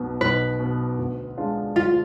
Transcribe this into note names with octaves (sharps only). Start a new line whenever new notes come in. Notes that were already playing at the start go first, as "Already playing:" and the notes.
Already playing: B1 B2 B3
B1 B4
B2 B3
D2
D3 G#3 D4 F4
D2 F4